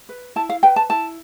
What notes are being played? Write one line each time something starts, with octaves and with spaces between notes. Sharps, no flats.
B4
E4 A5
F5
B4 G5
A5
E4 A5